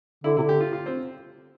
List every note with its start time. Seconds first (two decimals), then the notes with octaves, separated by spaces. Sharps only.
0.24 D3 E4
0.37 C3 E4
0.42 D3
0.49 G4
0.60 F4
0.73 F4
0.86 C4